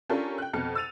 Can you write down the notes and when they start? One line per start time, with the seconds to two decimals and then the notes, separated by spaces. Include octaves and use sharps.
0.10 C#4 D4 F4 G4 A4 A#4
0.38 G5 F#6
0.53 F2 B2 F6 C#7
0.75 E6 A6 D#7 F7